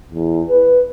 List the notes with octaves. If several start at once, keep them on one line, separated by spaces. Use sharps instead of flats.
E2
B4